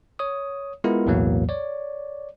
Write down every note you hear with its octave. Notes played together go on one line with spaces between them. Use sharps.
C#5 D#6
G#3 B3 E4 F4 A#4
B1 E2 A2 E3 F#3 A#3
C#5 D5